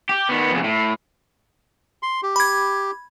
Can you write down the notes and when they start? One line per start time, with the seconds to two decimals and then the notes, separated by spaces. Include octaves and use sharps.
0.09 G4
0.29 D#3 B3
0.51 F2 C#3
0.64 A2
2.03 C6
2.23 G4
2.36 B5 G#6